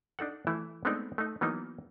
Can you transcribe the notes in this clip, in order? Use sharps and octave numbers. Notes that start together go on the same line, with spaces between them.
D4 D#4 A4 F#5
E3 A3 E4 E5
G#3 A3 B3 C4 D4 D#4
A3 D#4
E3 F#3 A#3 B3 D#4